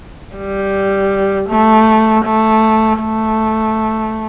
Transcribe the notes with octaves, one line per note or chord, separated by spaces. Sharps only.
G3
A3
A3
A3